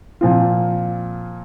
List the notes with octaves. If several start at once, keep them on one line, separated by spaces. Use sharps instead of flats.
A#2 F3 C4 F4